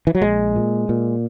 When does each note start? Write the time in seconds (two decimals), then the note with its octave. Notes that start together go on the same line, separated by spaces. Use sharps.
0.07 E3
0.15 F#3
0.22 A#1 G#3
0.56 A#2
0.89 A#2